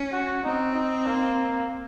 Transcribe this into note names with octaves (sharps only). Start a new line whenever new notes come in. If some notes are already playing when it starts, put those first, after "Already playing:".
Already playing: C#4
F#4
C4 D#4
D#4
A#3